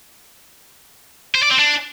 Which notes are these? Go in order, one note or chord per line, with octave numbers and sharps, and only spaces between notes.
C5
D5
C4
D4